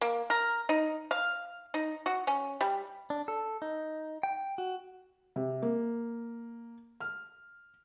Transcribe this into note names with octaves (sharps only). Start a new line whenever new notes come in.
A#3
A#4
D#4
F5
D#4
F#4
C#4
G3
D4
A4
D#4
G5
F#4
C3
A#3
F6